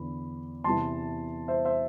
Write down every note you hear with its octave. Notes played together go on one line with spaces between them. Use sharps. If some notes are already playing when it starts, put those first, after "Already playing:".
Already playing: E2 D3 B5
E2 C3 E3 A5 C6
C5 E5
C5 E5